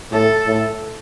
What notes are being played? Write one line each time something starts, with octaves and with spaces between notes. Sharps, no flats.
A2 A4
A2